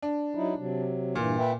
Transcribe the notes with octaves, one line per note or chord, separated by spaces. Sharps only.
D4
F#3 D#4 E4
C3 F#3
G2 A#2 E3
B4 E5 G5